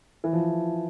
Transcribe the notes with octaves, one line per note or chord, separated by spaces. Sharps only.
E3
F3